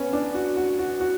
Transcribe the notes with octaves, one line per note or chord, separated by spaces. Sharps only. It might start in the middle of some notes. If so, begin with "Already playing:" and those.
Already playing: B3 C#4
D4
F#4
F#4
F#4
F#4